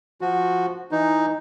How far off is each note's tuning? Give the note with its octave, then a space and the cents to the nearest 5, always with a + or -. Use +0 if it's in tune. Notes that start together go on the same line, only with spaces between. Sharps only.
F3 +0 F#4 -10
E3 +0 D#4 +0